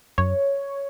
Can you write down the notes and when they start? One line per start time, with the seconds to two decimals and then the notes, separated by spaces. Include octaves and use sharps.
0.18 F#2 C#5